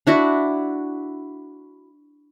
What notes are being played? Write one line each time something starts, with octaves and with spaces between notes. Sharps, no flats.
D4 E4 F#4